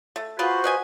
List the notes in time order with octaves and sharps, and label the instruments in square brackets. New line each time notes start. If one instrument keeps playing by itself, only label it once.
[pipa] A3
[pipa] F4 G#4 B4 [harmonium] F#4 C5
[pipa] B4 D#5 G#5